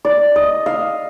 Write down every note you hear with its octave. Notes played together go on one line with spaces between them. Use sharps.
D5
D#5
F5